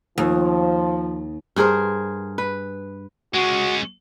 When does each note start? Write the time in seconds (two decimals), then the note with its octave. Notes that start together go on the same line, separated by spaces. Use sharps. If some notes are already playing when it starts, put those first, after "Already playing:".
0.18 D#2 F3
1.56 G2 G#4 A#4 C5
2.38 B4
3.34 G#3 C#4 F#4